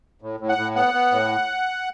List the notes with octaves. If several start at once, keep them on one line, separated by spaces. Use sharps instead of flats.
A2
A2
F#5
A2
B3 F#5
B3
A2